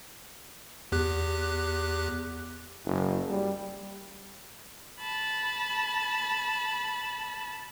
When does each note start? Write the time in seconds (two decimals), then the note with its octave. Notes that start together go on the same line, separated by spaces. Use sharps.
0.92 E2 G4 F#6
2.85 F#1
3.30 G3
5.00 A5 B5